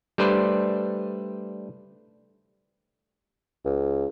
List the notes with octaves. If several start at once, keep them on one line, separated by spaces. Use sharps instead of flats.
G3 A3 D4 B4 C5
C#2